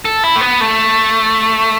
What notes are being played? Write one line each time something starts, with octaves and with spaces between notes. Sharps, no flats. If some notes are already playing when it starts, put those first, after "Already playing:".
A4
E4
A3
B3
A3